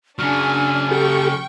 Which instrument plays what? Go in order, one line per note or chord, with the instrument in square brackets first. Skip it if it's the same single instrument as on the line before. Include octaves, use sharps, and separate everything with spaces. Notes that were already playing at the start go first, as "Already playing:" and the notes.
[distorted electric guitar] C#3 F#3 [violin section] D4 G#5 [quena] F6
[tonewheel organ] G4 A4 [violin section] G5 C#6